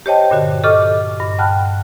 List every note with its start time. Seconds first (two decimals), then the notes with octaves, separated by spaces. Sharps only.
0.06 G4 C5 C#5 D#5 G5 A5
0.30 G2 A#2 D3 F#4
0.64 G4 A4 D#5 C#6 D6 F6
1.20 G2
1.38 F#5 G5 A5 B5 F6 F#6